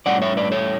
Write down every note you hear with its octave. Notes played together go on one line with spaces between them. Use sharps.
A2 G3 C#4 D5 F#5
C#5 E5
B4 D5
A4 C#5